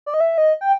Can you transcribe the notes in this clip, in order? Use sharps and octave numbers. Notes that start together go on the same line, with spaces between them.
D5
D#5
E5
D#5
G5